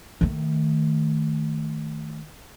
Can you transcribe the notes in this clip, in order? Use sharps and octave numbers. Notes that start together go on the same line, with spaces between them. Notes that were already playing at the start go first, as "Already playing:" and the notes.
D#3 A3